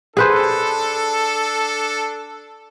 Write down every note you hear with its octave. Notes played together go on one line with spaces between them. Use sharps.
D4 G#4 A4 B4 C5